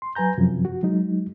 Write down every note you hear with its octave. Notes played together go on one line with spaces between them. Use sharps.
C6
F#3 B4 G#5 A#5 G6
F#2 C3 F3
F#4
F#3 G#3 D#4